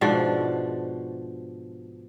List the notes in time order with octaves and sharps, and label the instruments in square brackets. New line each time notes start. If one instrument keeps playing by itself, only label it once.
[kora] G#2 B2 F3 D4